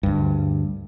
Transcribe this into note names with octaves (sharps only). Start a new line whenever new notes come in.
D2 G2